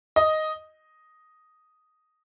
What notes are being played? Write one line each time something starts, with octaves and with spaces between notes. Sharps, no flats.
D#5